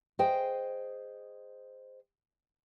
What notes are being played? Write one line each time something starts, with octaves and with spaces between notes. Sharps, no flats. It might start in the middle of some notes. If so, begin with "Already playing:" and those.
G#4 C5 D#5 G5